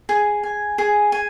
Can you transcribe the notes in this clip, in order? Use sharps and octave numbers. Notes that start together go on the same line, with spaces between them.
G#4
G#5
G#4
G#5